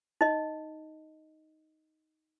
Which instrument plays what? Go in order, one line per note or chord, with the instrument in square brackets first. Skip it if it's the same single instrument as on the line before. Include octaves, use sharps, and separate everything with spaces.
[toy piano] D#4 D#5